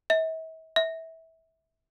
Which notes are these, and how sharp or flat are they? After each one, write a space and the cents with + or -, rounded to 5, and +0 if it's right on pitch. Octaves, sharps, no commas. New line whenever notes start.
E5 -45
E5 -20